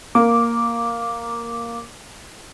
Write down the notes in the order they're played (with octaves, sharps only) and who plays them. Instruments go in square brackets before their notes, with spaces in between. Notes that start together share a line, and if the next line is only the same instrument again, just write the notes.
[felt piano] A#3 [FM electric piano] D6